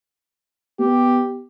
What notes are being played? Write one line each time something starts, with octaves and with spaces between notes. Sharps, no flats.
B3 G4